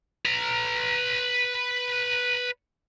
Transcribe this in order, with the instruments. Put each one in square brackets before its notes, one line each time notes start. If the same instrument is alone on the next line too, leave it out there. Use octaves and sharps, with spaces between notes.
[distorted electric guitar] B4 A#5